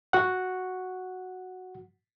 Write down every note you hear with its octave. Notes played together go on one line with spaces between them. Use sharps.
F#4 F#5